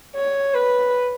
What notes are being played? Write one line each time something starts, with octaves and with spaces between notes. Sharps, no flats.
C#5
B4